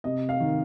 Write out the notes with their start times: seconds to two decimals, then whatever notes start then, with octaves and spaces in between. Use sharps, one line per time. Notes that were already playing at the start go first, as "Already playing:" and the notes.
0.04 C3 D#5
0.29 F5
0.40 D#3